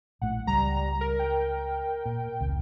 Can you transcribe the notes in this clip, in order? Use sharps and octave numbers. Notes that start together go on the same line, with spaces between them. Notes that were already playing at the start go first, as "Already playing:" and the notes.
A#1 A2 A3 F#5
C#2 G3 A#5
A#4
G5
A#2
F1 C#2